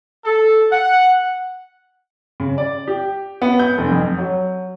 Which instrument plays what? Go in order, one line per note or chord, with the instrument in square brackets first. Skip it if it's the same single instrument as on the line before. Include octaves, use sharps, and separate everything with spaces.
[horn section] A4
F#5
[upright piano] C#3
D5
G4
B3
G6
F1
F2
F#3